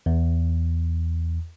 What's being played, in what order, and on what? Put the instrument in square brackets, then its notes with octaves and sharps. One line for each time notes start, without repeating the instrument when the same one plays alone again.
[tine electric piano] E2